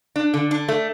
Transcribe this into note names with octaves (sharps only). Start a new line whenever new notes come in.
D4
D3
D4
A3